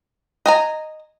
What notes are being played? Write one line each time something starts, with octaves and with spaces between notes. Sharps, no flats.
D#5 G#5 A#5